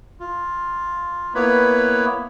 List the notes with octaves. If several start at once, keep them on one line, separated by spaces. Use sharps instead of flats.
F4
A#3 B3 E4 B4 C#5 B5